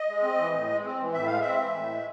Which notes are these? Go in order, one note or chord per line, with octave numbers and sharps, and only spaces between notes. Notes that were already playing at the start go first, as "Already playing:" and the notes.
Already playing: D#5
G#3
C4
E3
A2
G#3
C4
E3
A2 E5
G#3 F5
C4 E5
E3
A2
G#3